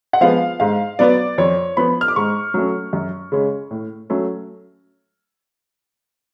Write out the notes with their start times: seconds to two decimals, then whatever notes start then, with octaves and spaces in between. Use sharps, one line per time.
0.13 F#5
0.21 F3 G#3 B3 F5
0.60 G#2 F5
0.99 F#3 B3 D5
1.38 F2 C#5
1.77 F3 B3 B5
2.01 F6
2.08 D6
2.16 G#2 C#6
2.54 F#3 A3 C#4
2.93 F#2
3.32 C#3 G#3 C#4
3.71 A2
4.10 F#3 A3 C#4